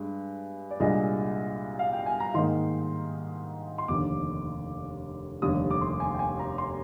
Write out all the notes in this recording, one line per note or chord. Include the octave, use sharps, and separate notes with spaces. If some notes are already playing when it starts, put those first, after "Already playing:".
Already playing: G2 G#3
D5
C2 A#2 G#3 D4 D#5
F5
G5
G#5
A#5
G#2 D#3 A#3 D#4 C6
C6
F1 D#2 D3 D6
F1 D#2 D3 G3 D#6
D6
C6
G#5
G5
G#5
A#5
C6